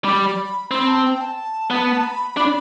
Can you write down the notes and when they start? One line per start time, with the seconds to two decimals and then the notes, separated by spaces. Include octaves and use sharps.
0.04 G3 B5
0.71 C4 B5
0.87 A5
1.05 G5
1.21 A5
1.70 B3
2.04 B5
2.37 D4